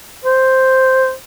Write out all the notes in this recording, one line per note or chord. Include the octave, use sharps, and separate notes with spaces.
C5